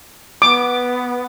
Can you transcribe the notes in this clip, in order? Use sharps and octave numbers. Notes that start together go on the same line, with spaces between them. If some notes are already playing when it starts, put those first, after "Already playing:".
B3 D6